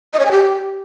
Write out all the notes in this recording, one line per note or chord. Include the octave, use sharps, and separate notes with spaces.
D#5
C#5
G#5
G4